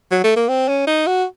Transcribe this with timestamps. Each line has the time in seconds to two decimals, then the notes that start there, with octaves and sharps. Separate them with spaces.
0.11 F#3
0.24 A3
0.36 A#3
0.49 C4
0.68 C#4
0.87 D#4
1.07 F#4